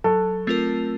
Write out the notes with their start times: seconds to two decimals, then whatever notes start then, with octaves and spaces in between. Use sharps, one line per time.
0.04 F#3 A4
0.47 A3 C4 F4 A#4